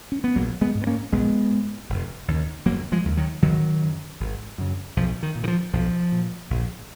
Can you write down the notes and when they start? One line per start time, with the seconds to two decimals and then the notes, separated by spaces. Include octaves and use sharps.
0.12 C#4
0.24 B3
0.36 A#1 F#3 A#3
0.61 G#3 B3
0.75 G#2
0.82 B3
0.87 A#3 C#4
1.12 A#1 G#3 B3
1.51 G#2
1.89 F1
2.28 D#2 C#3
2.66 F1 F#3 A#3
2.92 F3 G#3
3.04 D#2 C#3
3.17 D#3 F#3
3.42 G#1 D#3 F#3
3.81 F#2 C#3
4.20 G#1
4.58 F#2 C#3
4.97 B1 F3
5.23 D#3
5.35 A#2
5.44 D#3
5.48 F3
5.73 B1 F3
6.12 A#2
6.50 A#1